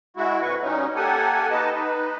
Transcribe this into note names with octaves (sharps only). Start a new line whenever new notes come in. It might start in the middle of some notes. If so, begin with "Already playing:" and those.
G#3 E4 F#4
F2 A#2 B4 C#6
G3 C#4 D#4
A#3 G4 A4 F#5 G#5
D#4 B4 D#5 A5
D#4 B4